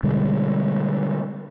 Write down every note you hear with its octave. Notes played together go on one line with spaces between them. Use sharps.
B2 D3 G3 G#3